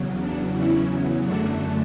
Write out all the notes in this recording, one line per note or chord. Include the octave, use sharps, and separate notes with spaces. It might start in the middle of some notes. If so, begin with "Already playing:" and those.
Already playing: E2 C#3 F#3
D4
C#4 E4
F#2 D3 A3 D4 F#4